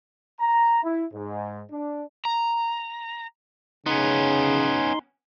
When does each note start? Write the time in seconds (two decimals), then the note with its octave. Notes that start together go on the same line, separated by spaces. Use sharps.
0.40 A#5
0.83 E4
1.13 G#2
1.71 D4
2.25 A#5
3.86 C#3 B3 C#4 D#4 C6